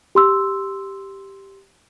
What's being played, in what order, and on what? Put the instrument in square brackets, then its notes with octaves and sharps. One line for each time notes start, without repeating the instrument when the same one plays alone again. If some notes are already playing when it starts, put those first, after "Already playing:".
[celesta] G4 C6 E6